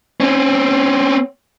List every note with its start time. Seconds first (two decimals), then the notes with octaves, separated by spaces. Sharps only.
0.20 C4 C#4